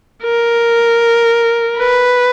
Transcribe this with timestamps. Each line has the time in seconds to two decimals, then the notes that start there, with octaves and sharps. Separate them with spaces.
0.24 A#4
1.78 B4